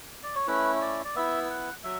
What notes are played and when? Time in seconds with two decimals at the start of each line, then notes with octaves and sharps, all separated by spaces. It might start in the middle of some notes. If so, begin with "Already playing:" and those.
0.23 D5
0.35 C#5
0.47 A3 C#4 E4 B4
0.81 D5
1.05 D5
1.15 B3 E4 E5
1.50 F#5
1.84 F#3 E5